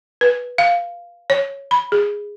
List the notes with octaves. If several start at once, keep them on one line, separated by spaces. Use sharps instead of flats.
B4
F5
C#5
B5
G#4